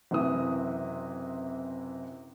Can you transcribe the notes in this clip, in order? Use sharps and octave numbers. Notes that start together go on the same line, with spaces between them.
F#1 C3 E3 D#6